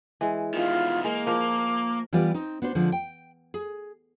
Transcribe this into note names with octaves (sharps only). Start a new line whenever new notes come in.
E3 G#3
B2 D#3 F4
G#3 A#3
F3 A#4 D6
E3 G3 B3 F4 G4 D5
C4 D#4
B3 D4 F#4 C5
D3 F3 G#3 C4
G5
G#4